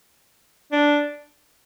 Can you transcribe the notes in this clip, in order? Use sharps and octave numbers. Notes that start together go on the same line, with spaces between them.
D4